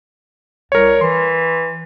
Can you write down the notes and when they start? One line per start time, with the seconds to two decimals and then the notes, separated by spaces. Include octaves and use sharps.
0.72 C2 A#4 C#5
1.01 E3 C6